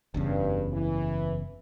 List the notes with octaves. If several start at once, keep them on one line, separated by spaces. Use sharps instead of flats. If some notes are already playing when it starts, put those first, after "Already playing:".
F#1 E2 G2 C#3
E3